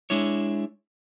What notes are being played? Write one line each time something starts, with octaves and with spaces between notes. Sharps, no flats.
G#3 D4 E4 C#5